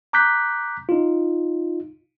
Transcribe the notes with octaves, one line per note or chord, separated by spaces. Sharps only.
A#5 D6 F#6 G6 B6
D#4 F4